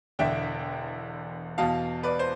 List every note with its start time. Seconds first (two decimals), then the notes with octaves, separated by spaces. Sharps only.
0.19 E1 E2 D3 E5 G5
1.58 E2 B2 F5 A5
2.03 B4 D5
2.19 C5